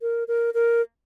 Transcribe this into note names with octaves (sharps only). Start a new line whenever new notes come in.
A#4
A#4
A#4